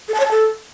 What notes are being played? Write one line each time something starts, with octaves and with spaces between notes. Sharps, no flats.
A4
A5
C#5
A5
A4